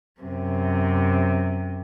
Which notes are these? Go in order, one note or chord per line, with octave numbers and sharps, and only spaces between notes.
F#2 C3